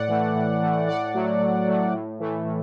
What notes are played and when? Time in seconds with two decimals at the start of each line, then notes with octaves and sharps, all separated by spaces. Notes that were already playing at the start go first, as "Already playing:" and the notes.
Already playing: A2 D5 F#5
0.08 E3 A3
0.35 A2
0.62 E3 A3
0.87 A2 D5 F#5
1.14 F#3 A3
1.39 A2
1.66 F#3 A3
1.93 A2
2.19 E3 A3
2.45 A2